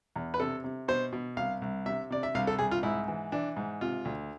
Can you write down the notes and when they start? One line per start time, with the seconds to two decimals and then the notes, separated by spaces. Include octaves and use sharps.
0.16 E2
0.34 B4
0.40 C3 A4
0.64 C3
0.88 B2 C5
1.13 B2
1.37 C2 F5
1.62 C2
1.86 C3 E5
2.11 C3 D5
2.23 E5
2.35 C2 F5
2.47 A4
2.59 C2 G#4
2.71 F4
2.83 G#2 E4
3.08 E3
3.32 E3 D4
3.57 G#2
3.81 C3 F4
4.05 D2